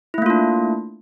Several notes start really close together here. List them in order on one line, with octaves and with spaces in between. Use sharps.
E4 A3 A#3 F4 D4